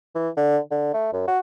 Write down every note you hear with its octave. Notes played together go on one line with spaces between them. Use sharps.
E3
D3
D3
A3
F#2
F#4